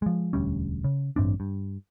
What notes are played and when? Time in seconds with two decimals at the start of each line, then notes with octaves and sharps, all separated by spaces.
0.02 F3 G#3
0.33 E1 D2 G3 C#4
0.84 C#3
1.16 A1 G2 C4 D4
1.40 G2